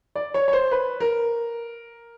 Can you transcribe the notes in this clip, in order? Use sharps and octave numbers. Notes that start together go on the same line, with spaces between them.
D5
C#5
C#5
C5
B4
A#4